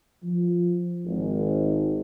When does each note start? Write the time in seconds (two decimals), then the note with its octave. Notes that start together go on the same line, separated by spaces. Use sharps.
0.23 F3
1.05 G#1